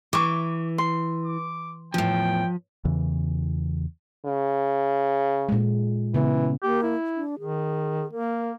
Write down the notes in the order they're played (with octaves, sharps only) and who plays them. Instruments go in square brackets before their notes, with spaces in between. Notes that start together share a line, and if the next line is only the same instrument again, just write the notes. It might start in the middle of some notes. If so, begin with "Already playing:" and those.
[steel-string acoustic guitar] E3 [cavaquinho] C#6 D6
[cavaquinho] C6
[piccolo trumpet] D6
[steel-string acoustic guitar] E2 A2 [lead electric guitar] F3 [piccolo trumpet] G5
[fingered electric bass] E2 C#3 E3
[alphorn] C#3
[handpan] A#2 G#3
[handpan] C#3 B3 [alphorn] E3
[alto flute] A#3 [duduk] G4
[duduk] E4
[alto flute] D4
[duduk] D#3 [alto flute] G#4
[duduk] A#3 [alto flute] A#4